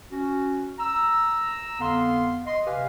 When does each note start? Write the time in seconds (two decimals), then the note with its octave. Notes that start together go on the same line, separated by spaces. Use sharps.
0.11 C#4 F#4
0.79 A#5 E6
1.80 F2 D3 B3 F5 C6
2.47 D#5 C6
2.66 C3 G4 B4 F5 G#5 D6